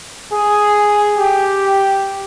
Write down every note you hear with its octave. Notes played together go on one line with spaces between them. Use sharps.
G#4
G4